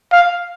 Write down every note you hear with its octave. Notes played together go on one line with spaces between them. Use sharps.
F5